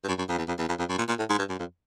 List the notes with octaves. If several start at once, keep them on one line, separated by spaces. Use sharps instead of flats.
G2
F#2
F#2
F2
E2
F2
E2
F2
F2
F#2
A#2
A#2
A2
G#2
G2
F#2
F2